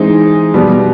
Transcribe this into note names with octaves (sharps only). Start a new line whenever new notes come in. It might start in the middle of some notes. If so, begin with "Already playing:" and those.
Already playing: E3 G#3 C4 D#4 G#4
B2 G3 B3